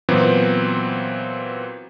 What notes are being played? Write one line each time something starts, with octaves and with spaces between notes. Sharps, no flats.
A#2 E3 F#3 B3 C4